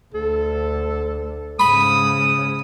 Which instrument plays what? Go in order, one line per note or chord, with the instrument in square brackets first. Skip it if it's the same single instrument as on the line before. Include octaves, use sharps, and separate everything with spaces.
[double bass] D2 [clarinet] A4
[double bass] G#2 C#3 [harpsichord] B5 [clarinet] D#6